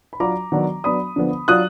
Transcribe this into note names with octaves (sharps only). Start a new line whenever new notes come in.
B5
F#3 D4 F4 A#5 D6
D#3 F#3 B3 D4
F#3 B3 D4 B5 D#6
D3 F3 B3
F#3 D4 F4 D#6 F#6